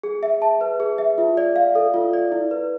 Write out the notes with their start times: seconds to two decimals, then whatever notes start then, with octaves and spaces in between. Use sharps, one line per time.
0.03 G#4
0.23 E5
0.42 A5
0.61 B4
0.80 G#4
0.98 E5
1.18 F4
1.37 D5
1.56 F5
1.75 A4
1.94 F4
2.13 D5
2.32 E4
2.51 B4